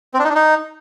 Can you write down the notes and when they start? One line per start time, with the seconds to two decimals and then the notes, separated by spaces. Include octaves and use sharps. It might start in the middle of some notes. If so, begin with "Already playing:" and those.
0.14 C4
0.19 D4
0.24 D#4
0.30 D4
0.35 D#4